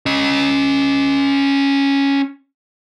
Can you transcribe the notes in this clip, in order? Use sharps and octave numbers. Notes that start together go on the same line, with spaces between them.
C#4 D#5